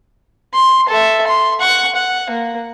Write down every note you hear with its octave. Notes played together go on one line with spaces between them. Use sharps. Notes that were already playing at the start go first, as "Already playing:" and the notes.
C6
A4 E5
C6
F#5 C#6
F#5
A#3